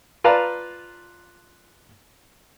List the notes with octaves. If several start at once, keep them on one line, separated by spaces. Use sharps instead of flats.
F4 B4 D5 F5 A5 A#5